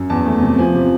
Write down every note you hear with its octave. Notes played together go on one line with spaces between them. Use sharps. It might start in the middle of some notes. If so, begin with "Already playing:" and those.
Already playing: F#2
E2 A5
A3
C3
F3 G#5
C3